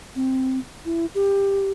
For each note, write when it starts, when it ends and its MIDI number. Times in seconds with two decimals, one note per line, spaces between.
0.15 0.59 60
0.85 1.06 64
1.15 1.72 67